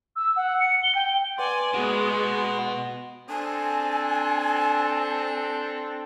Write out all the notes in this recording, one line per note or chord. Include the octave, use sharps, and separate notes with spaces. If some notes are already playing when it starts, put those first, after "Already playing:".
E6
F#5
C#7
G7
G5
B4 D5 F#5 G#5 C6
B2 G#3 B3 F#4
C4 D4 A4 G#5